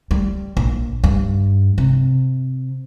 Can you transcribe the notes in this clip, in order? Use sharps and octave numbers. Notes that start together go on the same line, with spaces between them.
G3
A#1
G2
C3